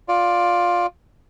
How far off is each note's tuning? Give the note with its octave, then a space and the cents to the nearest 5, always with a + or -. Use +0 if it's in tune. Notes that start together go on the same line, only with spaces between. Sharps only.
F4 +10 D5 +0